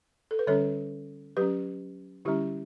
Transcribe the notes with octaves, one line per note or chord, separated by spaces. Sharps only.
A4
B4
D3 G3 C#4 A4 C#5
F#3 C#4 G4 B4
D3 G3 C#4 E4 G4